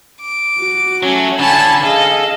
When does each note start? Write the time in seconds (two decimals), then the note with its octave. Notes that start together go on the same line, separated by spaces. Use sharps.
0.21 D6
0.59 F#4
1.03 F#3 A3 C#4
1.39 D3 C#5 G#5 A5 B5
1.83 G#4 A4 D#5 F5